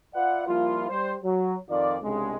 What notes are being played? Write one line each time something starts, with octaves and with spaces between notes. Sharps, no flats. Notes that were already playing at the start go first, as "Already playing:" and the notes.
F4 B4 D5 E5 F#5
F3 G3 A#3 E4 F4
G3 C5
F#3
F2 D#3 F4 D5
C2 G2 C#3 G#3